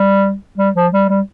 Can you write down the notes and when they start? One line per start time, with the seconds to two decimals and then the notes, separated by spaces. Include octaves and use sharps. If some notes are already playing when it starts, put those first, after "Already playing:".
Already playing: G3
0.58 G3
0.75 F3
0.93 G3
1.09 G3